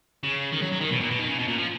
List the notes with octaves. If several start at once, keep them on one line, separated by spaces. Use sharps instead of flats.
C#3
D#3
F#3
F#3
D#3
B2
A#2
B2
D#3
C#3
B2
A#2
F3